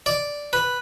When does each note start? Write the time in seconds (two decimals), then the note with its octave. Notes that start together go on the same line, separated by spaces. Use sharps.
0.06 D5
0.53 B4